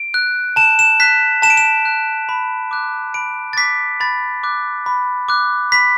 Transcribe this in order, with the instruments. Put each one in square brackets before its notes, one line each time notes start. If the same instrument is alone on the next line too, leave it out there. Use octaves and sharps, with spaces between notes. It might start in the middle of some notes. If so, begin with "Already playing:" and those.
Already playing: [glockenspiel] D7
F#6
A5 E7
E7
F#6 B6
A5 E7
D7
E7
F#6
B5
D6 F#6
B5 D7
A6
D6 F#6 B6
B5 A6
D6 F#6
B5
D6 F#6
B5 B6